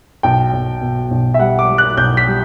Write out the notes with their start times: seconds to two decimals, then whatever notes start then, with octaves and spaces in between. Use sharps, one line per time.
0.23 B1 G5
0.53 B1
0.81 B2
1.11 B1
1.34 E5
1.39 G3 F#5
1.59 D6
1.69 G3
1.78 F#6
1.97 B1 G6
2.17 B6
2.27 G3